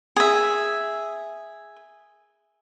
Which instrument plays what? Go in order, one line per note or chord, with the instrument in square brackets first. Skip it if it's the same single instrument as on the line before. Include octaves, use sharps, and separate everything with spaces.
[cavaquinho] G#4 E5